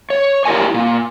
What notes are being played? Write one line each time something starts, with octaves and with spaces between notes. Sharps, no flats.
C#5
E4 G4 A#4 D5 G#5
A#2